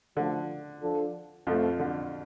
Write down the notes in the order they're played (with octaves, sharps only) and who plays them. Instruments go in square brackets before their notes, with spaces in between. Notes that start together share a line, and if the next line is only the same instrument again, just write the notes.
[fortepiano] D3 [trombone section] F3 A3 F4 A4
[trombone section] F3 D4 F4 A4
[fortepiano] F2 F3 [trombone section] A3 C4 A4
[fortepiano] D3